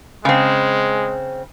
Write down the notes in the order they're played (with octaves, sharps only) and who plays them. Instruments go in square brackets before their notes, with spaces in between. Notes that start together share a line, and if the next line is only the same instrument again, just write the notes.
[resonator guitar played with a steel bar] C#3 C4 [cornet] G#3